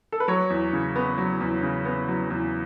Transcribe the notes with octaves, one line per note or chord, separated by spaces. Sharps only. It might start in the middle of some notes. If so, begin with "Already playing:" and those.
A4
B4
F#3 C#5
E2
C#3
B3
F#3
E2
C#3
B3
F#3
E2